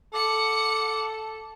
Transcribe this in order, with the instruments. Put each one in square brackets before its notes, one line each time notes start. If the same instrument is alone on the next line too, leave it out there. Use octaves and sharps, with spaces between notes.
[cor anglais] A4 [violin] F#5 C#7 [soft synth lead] D6